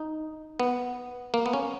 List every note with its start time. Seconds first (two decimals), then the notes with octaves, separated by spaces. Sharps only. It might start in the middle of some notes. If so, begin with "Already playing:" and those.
Already playing: D#4
0.60 B3
1.34 A#3
1.46 B3
1.53 C#4